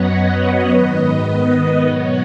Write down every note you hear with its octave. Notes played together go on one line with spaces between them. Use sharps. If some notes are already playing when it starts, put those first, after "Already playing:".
Already playing: F#2 F#3 B3 B4 C#5 D#5 F#5
B4 D#5
C#5 F#5
G#2 D#3 B3 B4 D#5
B4 D#5
B4 D#5
B2 F#3 B3 C#5 F#5